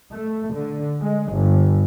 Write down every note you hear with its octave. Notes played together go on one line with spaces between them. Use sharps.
A3
D3
G#3
G1